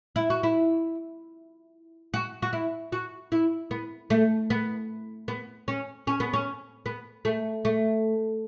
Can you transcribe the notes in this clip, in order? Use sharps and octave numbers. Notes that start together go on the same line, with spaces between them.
E4
F#4
E4
F#4
F#4
E4
F#4
E4
B3
A3
B3
B3
C#4
C#4
B3
C#4
B3
A3
A3